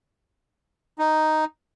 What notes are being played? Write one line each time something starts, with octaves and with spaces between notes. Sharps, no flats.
D#4